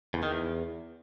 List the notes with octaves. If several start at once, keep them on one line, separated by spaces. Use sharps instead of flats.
E2
D#3
E2